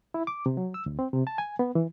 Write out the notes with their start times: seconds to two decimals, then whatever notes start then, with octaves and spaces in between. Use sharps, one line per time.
0.14 E4
0.27 D6
0.46 C3
0.57 F#3
0.74 E6
0.86 D2
0.99 C4
1.13 C3
1.27 A5
1.38 G#5
1.59 B3
1.75 E3